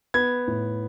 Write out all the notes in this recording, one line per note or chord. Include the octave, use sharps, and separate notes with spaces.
B3 G#6
A2